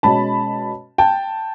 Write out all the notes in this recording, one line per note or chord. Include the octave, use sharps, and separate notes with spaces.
B2 G#3 C#4 A5 B5
G5 A5